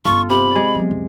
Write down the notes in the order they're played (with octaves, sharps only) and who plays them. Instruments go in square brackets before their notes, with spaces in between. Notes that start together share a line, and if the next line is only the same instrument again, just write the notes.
[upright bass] G1 C#4 [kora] F4 A4 [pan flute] C#6
[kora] C3 [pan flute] B5
[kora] G#3 D5
[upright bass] F#3 B3
C#2 F#2